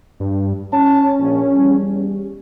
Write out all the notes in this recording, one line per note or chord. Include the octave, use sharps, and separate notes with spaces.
G2
C#4 A5
A#1
E2 G3